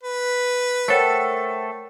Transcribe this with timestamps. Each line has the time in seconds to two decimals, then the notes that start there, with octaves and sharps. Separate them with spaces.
0.03 B4
0.88 A3 A4 A#4 C5 C#5 F#5 G5 A6